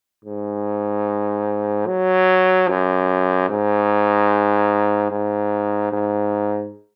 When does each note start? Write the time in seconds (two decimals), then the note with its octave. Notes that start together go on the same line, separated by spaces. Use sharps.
0.25 G#2
1.87 F#3
2.68 F#2
3.49 G#2
5.11 G#2
5.92 G#2